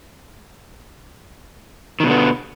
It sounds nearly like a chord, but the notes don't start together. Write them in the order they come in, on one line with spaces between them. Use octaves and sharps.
D#3 B2 D3 B3